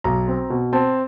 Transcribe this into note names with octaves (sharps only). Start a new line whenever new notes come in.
B1 A#5
C4
B2
C4 A5